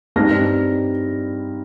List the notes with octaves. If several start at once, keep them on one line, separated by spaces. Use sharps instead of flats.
G2 G3 C4 D#4 F6 A#6